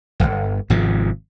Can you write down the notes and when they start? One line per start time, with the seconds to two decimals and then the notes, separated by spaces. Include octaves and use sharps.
0.20 D1 G1
0.70 G#1 G#2 C3 F3